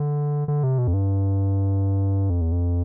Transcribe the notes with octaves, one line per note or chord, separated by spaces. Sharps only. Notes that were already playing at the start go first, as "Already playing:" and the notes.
Already playing: D3
D3
C3
B2
F2
G2
F2
E2
F2